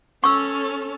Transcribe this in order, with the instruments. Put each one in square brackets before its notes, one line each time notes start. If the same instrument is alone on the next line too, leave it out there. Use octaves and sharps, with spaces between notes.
[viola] C#4 A4 [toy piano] C#6 E6